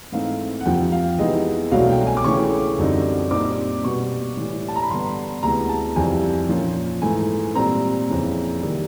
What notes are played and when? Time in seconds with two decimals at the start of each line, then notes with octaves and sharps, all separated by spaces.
0.12 G#2 E3 A3 C4 D#4 F5
0.60 F#5
0.66 F2 C3 F3 G5
0.92 F5
1.18 C3 E3 G#3 B3 D#4 D#5
1.71 C2 B2 F#3 A3 D4 F5
1.89 G5
2.07 G#5
2.17 D6
2.24 C#3 E3 A3 C#4 C#6
2.78 F#2 D3 G3 C4 D#4
3.31 A#2 G3 C4 D#4 D6
3.84 B2 G3 B3 C#6
4.37 A2 E3 G3
4.68 A5
4.76 A#5
4.82 B5
4.90 G2 D3 G3 B3 C6
5.43 D2 C3 E3 G#3 B3 A#5
5.69 A5
5.96 F2 C3 E3 G3 G#5
6.49 A#2 F3 A#3 C#4
7.02 G#2 E3 A3 G#5
7.55 A#2 G3 C4 A#5
8.08 F2 C#3 E3
8.61 C3 D#3 G3 A#3